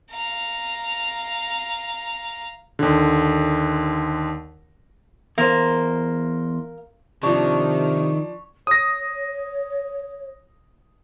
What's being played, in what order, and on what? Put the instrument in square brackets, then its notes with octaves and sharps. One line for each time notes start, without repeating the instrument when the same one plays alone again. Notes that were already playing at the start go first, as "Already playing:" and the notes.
[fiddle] F5 A#5
[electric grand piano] D#2 D3
[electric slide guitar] E2 C5 [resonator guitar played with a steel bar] A#3
[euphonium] C3 [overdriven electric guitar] D#3 [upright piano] F3 D4 [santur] C#5
[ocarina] C#5 [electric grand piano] D#6 A#6